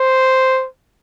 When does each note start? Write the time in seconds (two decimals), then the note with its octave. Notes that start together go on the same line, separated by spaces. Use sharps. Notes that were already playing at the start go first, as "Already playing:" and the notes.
Already playing: C5